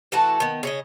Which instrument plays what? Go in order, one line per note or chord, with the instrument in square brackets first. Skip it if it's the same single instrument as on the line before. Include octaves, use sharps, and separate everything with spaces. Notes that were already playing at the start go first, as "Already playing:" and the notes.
[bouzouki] E3 A3 F#4 A5
D#3 B3
C#3 C#5 D#5